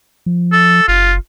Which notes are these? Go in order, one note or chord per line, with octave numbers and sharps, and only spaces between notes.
F3
A4
F#1 F4